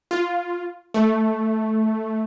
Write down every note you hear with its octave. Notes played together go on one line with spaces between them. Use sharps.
F4
A3